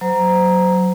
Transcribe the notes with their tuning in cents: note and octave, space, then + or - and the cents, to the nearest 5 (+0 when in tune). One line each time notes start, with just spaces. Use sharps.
F#3 +0 C5 -25 A#5 +5